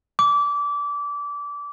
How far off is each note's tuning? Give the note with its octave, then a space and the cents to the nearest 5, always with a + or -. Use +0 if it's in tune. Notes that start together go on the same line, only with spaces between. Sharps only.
D6 -25